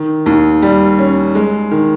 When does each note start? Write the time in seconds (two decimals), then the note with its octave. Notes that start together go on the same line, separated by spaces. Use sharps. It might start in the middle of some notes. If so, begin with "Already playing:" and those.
Already playing: D#3
0.26 D#2
0.62 G3
0.99 C#4
1.35 G#3
1.71 D#3